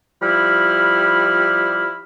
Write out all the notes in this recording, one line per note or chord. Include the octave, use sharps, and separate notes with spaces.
F3 G3 E4 B5 F6